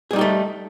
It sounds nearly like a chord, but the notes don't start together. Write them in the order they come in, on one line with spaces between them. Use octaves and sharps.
G#4 G3 D#4 G4 A3